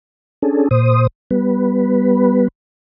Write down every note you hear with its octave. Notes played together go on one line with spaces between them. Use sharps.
C#4 D4 G#4 A4
A#2 C5 D#6
G3 B3 B4